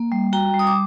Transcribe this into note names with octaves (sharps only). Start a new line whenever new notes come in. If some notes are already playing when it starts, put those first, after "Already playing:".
Already playing: A#3
G3
F#4 G5 A#5
G3
D#6
D6